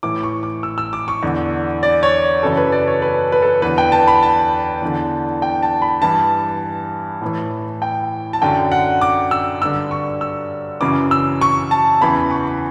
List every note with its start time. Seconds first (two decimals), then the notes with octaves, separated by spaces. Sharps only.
0.03 A2 E3 D6
0.23 C#6
0.43 D6
0.63 E6
0.78 E6
0.93 D6
1.08 C#6
1.23 E2 D3
1.83 D5
2.03 C#5
2.43 F#2 C#3 E3 A4
2.57 B4
2.72 D5
2.87 C#5
3.02 B4
3.32 B4
3.42 A4
3.62 E2 D3 B4
3.78 G5
3.92 A5
4.07 B5
4.23 A5
4.82 E2 D3
5.42 G5
5.62 A5
5.82 B5
6.02 G2 E3 A5
7.21 A2 E3
7.82 G5
8.33 A5
8.42 F#2 D3 G5
8.72 F#5
9.01 D6
9.31 E6
9.61 G2 D3 E6
9.91 C#6
10.21 E6
10.81 F#2 C#3 E3 D6
11.11 E6
11.41 C#6
11.71 A5
12.01 E2 C#3 E3 B5
12.31 C#6